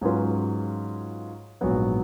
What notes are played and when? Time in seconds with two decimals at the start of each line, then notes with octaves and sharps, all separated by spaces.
0.01 G#2 F#3 C#4 F4 B4
1.61 A#1 G#2 F#3 B3 F#4